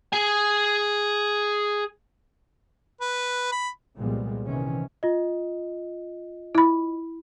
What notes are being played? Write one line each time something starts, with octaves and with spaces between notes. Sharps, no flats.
G#4 G#5
B4
B5
C2 A#2 F3 G3 G#3 B3
C3 D#3 E3 C#4
F4 D#5
E4 B5